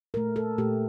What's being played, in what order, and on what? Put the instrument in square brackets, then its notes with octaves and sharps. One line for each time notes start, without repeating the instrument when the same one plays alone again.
[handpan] A#2 A3 A#4
A4
A#2 A3 G4